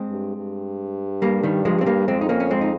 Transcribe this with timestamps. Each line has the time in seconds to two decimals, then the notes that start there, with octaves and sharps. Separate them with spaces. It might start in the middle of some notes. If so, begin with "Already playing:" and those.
Already playing: G#3 C4
0.09 G2
0.37 G2
1.22 G3 A#3
1.43 D#3 G3
1.65 F3 G#3
1.81 C4
1.86 G3 A#3
2.08 F2 G#3 C4
2.21 D#4
2.29 A#3 C#4
2.40 C#4
2.51 G#3 C4
2.61 D#4